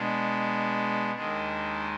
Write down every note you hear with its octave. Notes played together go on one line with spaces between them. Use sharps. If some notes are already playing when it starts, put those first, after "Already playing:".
Already playing: B2 G#3 D4
D#2 D#3 G#3 D4